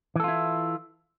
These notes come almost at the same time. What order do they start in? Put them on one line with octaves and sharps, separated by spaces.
E3 A4 F4 E4